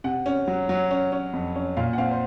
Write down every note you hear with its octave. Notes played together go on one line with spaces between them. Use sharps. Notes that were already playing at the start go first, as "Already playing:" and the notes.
C3 F#5
C#4
F#3
F#3
C#4
C#4
F2
C#4
A#2 F5
F#5
C4 F5
C5